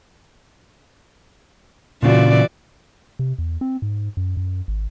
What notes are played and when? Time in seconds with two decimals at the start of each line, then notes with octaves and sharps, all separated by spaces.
2.03 A#2 C#3 E3 F4 F#4 D5
3.19 C3
3.39 E2
3.61 C4
3.82 G#2
4.17 F#2
4.37 F#2
4.68 G#1